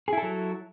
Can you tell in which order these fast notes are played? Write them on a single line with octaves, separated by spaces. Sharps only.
G#4 E4 A4 F#3